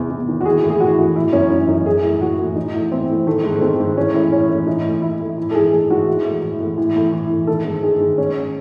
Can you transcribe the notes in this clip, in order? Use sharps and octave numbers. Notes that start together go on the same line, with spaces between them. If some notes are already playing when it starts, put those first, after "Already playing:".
Already playing: E2 C3
E2
D#3
F#4
E3 G#4
A2
G#4
E3 F#4
A2
E3 E4
F#2 C#4
E3 D#4
F#2 D#4
E3 G#4
A2
E3 F#4
A2
E3 D#4
A2
E3 C4
A2
D#3 A3
G#2
A3
D#3 C4
G#2
E3 C#4
A2
E3 C#4
A2
E3 D#4
A2
E3 E4
A2
E3
A4
G#2 G#4
E3 G#4
G#2 F#4
E3
A2
E3
A2
E3
A2
E3
A2
D#3 A4
G#2
D#3 G#4
G#2
D#3 C#4